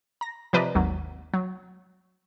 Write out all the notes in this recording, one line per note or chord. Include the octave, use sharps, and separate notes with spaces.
A#5 A#6
C3 F3 B4 D5 D#5 A#5
G#1 D#2 F#3
F#3